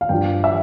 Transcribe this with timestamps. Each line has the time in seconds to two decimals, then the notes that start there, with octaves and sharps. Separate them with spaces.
0.01 F5
0.09 G2 F3 G5
0.44 E5